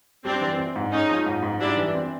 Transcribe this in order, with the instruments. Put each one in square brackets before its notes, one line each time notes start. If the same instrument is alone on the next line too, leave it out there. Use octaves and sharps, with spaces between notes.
[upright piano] G3 [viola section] C4 D4
[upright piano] E3
C4
G#2
[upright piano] G#3 [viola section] C#4 D#4
[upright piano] F3
G#2
G#2
[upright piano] G3 [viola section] D4 E4
[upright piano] E3
C4